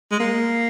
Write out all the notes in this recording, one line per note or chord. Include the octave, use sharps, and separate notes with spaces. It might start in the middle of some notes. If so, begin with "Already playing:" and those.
G#3
A#3